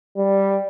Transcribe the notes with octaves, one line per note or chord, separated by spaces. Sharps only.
G3